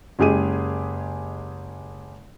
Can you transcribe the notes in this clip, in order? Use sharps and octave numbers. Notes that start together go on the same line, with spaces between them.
F#1 G#3 G4 G#4 D#7